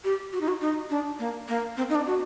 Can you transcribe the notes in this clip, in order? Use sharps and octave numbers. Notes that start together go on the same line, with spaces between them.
G4
F#4
D#4
F#4
D#4
D4
A#3
A#3
C4
D#4
D4
F#4